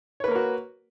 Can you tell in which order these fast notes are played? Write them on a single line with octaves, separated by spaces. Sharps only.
C#5 B4 A#3 A#4 F#4